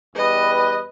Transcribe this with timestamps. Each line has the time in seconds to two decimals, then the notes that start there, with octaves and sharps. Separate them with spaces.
0.16 E2 G3 B4 D#5